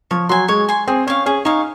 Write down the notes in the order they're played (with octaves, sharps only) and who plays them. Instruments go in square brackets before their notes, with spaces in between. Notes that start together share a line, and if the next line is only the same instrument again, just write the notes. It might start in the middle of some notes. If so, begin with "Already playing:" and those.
[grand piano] F3 [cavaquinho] C#5
[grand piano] F#3 [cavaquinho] G#5 C6
[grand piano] G#3 [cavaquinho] C#5
[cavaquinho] G#5 C6
[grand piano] C4 [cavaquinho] G#4
[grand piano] C#4 [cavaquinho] C#5 F5
[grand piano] C#4 [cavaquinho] G#4
[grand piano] D#4 [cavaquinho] C#5 F5